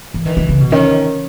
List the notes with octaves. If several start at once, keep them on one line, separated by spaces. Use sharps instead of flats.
E3
D#3 E3
D#3
C#3
B2
D#3 C#4